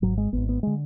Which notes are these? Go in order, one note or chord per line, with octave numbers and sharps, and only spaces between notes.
G#1 G#2 F#3
G#3
G#1 G#2 B3
B3
D3 G#3